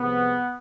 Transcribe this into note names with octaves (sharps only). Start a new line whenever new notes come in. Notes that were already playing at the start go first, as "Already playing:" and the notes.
Already playing: C2 C3 F3 G#3 B3